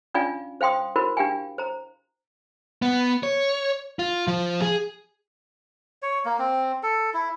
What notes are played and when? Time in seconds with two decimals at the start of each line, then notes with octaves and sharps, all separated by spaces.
0.14 C#4 D4 F4 D5 F5 G#5
0.61 C5 F5 G5 C6 D#6
0.96 E4 F#4 A#4 C5 B5
1.17 D4 G4 F5 G5 G#5
1.58 C5 A#5
2.82 B3
3.23 C#5
3.99 F4
4.28 F3
4.62 G#4
6.02 C#5
6.25 A#3
6.39 C4
6.83 A4
7.14 E4